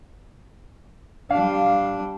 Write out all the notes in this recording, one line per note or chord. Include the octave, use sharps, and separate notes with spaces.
G3 D4 F5